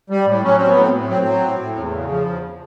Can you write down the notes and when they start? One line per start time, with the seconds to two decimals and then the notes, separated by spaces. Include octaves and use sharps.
0.10 G3
0.26 A2
0.43 F#3 C#4
0.57 F#3 C4
0.69 B3
0.76 A2
0.82 C4
0.93 A2
1.09 F#3 C4
1.26 F#3
1.42 A2
1.59 A2
1.76 E2
1.93 C#3
2.09 F3
2.25 E2